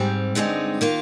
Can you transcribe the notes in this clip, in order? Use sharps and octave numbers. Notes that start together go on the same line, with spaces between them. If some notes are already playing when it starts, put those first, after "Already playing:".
Already playing: G#2 G3 C4
G2 D3 G#3 C4 D#4
D#3 A#3 F4